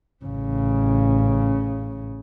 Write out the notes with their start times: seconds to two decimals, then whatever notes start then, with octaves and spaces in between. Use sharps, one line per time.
0.25 A1 C#3